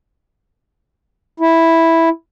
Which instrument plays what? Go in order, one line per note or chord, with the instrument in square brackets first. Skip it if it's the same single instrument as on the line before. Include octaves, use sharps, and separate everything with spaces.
[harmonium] E4